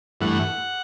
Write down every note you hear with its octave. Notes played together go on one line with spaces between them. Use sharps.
G2 E3 A3 F#5